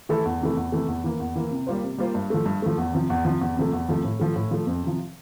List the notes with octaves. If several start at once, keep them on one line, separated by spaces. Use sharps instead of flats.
E3 A3 E4 A4
E2
C3 E3 A3
E2
C3 E3 A3
E2
E3 A#3
E2
E3 A#3
C3
G3 A#3 F4 C5
C3
G3 A#3 F4 C5
G2
F3 A3
G2
F3 A3
E2
C3 F3
E2
C3 F3
E2
C3 F3 A3
E2
C3 F3 A3
A2
F3 A3
A2
F3 A3
F2
C3 F3